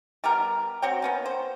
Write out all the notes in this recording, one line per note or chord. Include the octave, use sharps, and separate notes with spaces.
G3 B3 G4 A#4
C4 F#4 C#5 G5
A#3 B3 C#4
C5